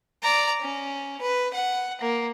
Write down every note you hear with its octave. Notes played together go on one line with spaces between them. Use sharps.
D5 A#5
C#4
B4
F#5
A#3